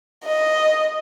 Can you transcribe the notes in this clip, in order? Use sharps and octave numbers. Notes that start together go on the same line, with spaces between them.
D#5